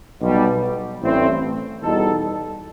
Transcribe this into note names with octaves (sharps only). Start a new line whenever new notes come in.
B1 B2 G3
A1 G2 E3 A3 C4
E2 B2 G3 D#4 A4